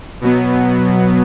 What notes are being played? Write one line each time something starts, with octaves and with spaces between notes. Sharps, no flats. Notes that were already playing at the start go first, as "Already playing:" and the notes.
B2 F#3 B3